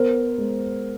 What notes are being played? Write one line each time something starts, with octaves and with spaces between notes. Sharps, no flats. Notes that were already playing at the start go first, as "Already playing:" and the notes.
Already playing: B3 A#4 C5
G#3